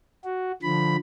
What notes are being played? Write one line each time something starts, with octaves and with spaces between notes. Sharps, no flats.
F#4
D3 F3 B5